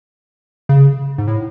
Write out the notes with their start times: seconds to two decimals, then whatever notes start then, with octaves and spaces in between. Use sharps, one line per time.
0.69 C#3
1.18 G#2
1.28 A2